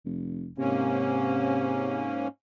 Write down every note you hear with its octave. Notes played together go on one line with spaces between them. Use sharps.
F1
G#2 C3 A#3 C#4